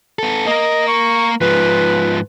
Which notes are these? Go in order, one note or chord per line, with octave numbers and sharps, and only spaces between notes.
B3 A4
A#3 A#4 D#5
C#6
G#2 F3 B4